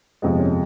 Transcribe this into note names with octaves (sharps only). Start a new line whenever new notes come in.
G1 F2 C3 F3 G#3
C#4